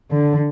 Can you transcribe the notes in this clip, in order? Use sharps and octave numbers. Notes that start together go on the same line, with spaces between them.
D3